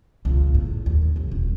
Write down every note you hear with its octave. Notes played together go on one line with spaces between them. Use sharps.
C#2 B2
A2
D#2
C2 F2
D#1